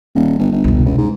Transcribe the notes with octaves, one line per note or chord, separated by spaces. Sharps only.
D#1
G1
G1
E1 C2
C#2
G#2